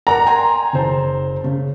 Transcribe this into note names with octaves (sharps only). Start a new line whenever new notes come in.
A#4 D5 F#5 A#5
G5 G#5 C6
F#1 C5 A5
C#3